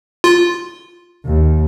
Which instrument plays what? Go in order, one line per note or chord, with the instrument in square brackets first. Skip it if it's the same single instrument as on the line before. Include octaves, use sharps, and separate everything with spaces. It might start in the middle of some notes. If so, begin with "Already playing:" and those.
[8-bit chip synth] F4
[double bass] D#2